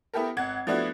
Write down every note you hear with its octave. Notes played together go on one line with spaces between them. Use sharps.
B3 E4 G4 A4 A#4
G#1 F#5 G#6
F3 A3 B3 D4 E4 F#4